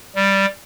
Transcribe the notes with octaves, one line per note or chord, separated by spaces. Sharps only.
G3